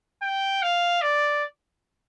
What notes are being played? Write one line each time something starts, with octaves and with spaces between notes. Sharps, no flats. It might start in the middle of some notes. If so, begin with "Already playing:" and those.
G5
F5
D5